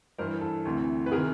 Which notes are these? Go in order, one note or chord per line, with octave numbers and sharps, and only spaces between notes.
G2 E3 A#4 C5
A4
D2 C3 E3
B4
C3 D#3 G#4 A#4